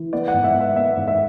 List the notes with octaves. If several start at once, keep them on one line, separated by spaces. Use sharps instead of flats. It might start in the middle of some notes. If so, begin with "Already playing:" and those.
Already playing: E3
B3 D5
F#5
G#2
E5
B3
E5
B3 E5
G#2
E5